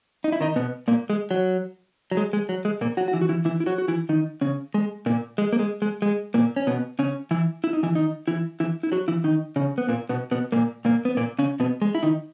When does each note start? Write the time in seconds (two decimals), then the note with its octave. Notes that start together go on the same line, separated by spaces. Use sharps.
0.24 D#4
0.32 E4
0.41 D#3 D#4
0.56 B2 B3
0.88 A#2 A#3
1.10 G#3
1.31 F#3
2.11 F#3
2.17 G#3
2.33 G#3
2.49 F#3
2.65 G#3
2.81 A#2 A#3
2.97 F#3 F#4
3.08 F#4
3.13 E3 E4
3.21 F#4
3.29 E3 E4
3.45 E3 E4
3.60 E4
3.66 F#3 F#4
3.78 F#4
3.88 E3 E4
4.09 D#3 D#4
4.41 C#3 C#4
4.74 G#3
5.06 A#2 A#3
5.38 G#3
5.53 A#3
5.59 G#3
5.82 G#3
6.02 G#3
6.34 A#2 A#3
6.56 C#4
6.67 B2 B3
6.99 C#3 C#4
7.31 E3 E4
7.64 E4
7.73 D#4
7.83 E3 E4
7.95 D#3 D#4
8.28 E3 E4
8.60 E3 E4
8.83 E4
8.92 F#3 F#4
9.08 E3 E4
9.24 D#3 D#4
9.56 C#3 C#4
9.78 B3
9.89 A#2 A#3
10.09 B2 B3
10.31 B2 B3
10.52 A#2 A#3
10.85 A#2 A#3
11.05 B3
11.17 A#2 A#3
11.39 C#3 C#4
11.60 B2 B3
11.82 G#3
11.95 E4
12.03 D#3 D#4